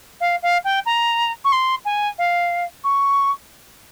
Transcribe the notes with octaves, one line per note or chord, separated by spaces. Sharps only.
F5
F5
G5
A#5
C#6
C6
G#5
F5
C#6